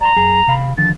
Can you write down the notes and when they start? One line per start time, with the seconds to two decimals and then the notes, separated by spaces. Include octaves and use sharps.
0.01 D5 A5 A#5 C6
0.16 F#2 G#4
0.47 C3 F5 B5
0.78 D3 D#3 F3 A6